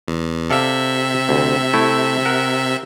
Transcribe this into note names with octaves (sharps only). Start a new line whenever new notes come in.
E2
C3 A4 D5 E5 F5
D2
A3 E4
A#4 F#5